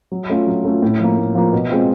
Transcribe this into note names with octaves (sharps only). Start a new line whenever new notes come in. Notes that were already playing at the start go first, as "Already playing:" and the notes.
F#3
A3 C#4 F4
F#3
A3 C#4 F4
A2
F3 A#3
A2
F3 A#3
B2
G#3 C4 F4